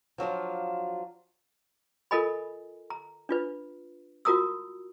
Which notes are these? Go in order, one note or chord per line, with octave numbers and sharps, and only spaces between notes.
F3 F#3 D4 F4
F4 A4 A#4 D#5 G#5 B5
A#5
D4 F4 B4
F4 F#4 A#4 A#5 D#6 E6